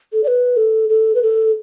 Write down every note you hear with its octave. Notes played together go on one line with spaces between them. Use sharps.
A4
D5
B4
A4
A4
B4
A4